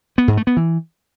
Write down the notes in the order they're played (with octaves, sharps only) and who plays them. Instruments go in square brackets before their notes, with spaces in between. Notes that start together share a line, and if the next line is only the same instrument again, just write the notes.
[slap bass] B3
G#2
A3
B3
E3